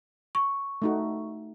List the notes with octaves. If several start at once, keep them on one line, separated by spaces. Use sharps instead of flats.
C#6
A3 D#4 F#4